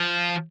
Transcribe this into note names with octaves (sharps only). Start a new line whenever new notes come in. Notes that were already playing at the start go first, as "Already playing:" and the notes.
Already playing: F3